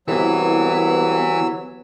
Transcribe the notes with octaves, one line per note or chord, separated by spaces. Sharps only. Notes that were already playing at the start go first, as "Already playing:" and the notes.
C2 E3 F#3 B3 E4 E6